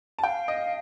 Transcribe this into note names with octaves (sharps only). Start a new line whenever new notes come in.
A5
F5 G5
D#5